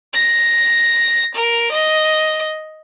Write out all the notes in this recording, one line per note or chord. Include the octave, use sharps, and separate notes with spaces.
A#6
A#4
D#5